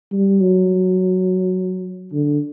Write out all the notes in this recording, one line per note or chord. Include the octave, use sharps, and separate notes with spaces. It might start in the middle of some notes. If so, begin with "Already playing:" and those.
G3
F#3
D3